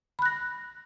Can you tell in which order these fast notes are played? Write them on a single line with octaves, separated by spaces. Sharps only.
B5 F#6 A#6